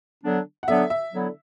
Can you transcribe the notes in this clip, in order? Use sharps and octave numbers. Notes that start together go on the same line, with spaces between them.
D3 F#3 B3 D4
F#5
D3 F#3 B3 D4 E5
E5
D3 F#3 B3 E4